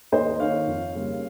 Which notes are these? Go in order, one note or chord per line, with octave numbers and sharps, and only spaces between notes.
D#2 C5 D#5
D#3 A#3 C#5 F5
F2
C#3 G3 A#3